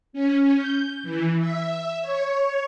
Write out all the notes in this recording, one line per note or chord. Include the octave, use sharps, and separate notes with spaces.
C#4
G6
E3
E5
C#5